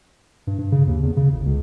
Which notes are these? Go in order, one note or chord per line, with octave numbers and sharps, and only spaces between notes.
G2
G2
C#3
D#2
E2
C#3
G1
C#2